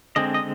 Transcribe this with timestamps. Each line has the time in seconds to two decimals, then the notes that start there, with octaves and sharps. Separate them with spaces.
0.16 D3 G#3 C4 D#5
0.34 D#5